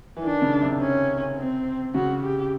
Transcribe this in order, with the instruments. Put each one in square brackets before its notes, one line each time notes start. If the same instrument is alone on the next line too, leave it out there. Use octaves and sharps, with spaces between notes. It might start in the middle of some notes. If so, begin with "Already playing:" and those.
[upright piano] E3
[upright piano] D#3 [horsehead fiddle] D4
[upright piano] C#3
C3
[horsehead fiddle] C#4
C4
[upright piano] C#3 [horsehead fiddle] F#4
[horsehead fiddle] G4